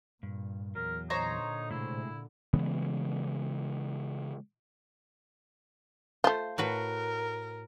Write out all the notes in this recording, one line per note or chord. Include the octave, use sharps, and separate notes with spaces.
G2 A#2
E2 F#3 A#4
A#2 D3 D#4 C5 C#5 A#5
A2 C3 G#3 E4
C#3 E3 G#3 B3
A3 F4 C5
A2 F#4 A#4 B4